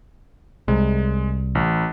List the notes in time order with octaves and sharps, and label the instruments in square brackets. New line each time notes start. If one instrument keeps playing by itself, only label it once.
[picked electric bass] C2 [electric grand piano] G#3
[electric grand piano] A1